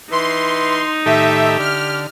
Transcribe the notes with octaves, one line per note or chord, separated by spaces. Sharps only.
E3 D#4 C6
A2 D#3 G4 A4 E5
D3 F6